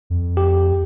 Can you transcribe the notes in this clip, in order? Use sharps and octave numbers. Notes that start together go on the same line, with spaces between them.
F2
G4